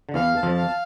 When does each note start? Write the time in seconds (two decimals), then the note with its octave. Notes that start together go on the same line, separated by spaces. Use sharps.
0.09 D3
0.14 E2 E3 F5
0.36 A5
0.43 F2 F3
0.57 F5